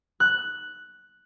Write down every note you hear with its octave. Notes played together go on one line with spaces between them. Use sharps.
F#6